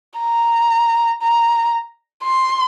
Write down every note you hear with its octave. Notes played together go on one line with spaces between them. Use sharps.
A#5
A#5
C6